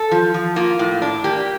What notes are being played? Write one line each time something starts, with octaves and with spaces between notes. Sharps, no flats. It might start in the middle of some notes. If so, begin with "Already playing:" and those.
Already playing: A4
F3
F3
A#3 F4
A2
D4
A#3 G4